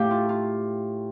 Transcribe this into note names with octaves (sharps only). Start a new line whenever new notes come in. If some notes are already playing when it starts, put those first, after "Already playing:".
Already playing: A2 A3 G4 F5
F4
F4